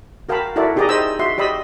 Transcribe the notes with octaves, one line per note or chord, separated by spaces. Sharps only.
F#4 A#4 F5 G5 A5 B5
E4 F#4 A4 A#4 D5 E5
D#4 G4 G#4 D5 D#5 A#5
C5 D#5 G5 B5 E6
F#4 E5 C6
G4 D5 D#5 B5 E6